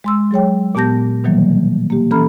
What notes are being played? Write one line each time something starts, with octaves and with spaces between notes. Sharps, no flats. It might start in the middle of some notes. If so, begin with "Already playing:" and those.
G#3 C6 E6
F#3 G#4 C#5 G5
A#2 B3 G4 A5 G6 A#6
B2 D#3 E3 F#3 G3 A#3
A#3 G4
E3 C#4 A4 A#5 B5 F6